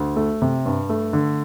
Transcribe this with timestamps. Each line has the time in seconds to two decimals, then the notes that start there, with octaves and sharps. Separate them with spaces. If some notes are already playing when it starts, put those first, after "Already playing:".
Already playing: D2
0.16 A3
0.42 C3
0.66 G2
0.89 A3
1.13 D3